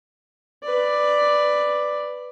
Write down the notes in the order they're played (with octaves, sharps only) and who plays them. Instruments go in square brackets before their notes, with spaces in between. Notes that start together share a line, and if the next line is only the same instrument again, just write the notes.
[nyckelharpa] B4 D5